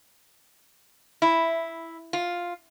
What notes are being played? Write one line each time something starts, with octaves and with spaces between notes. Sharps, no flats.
E4
F4